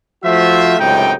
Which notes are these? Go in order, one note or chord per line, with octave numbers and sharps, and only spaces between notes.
F3 A3 F4 F#4 C5 E5
C#2 F#2 A2 C3 D#4 G5